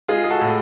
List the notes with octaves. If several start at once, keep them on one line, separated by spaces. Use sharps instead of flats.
G#3 F4 G#4
G#4
F#4 A4
A2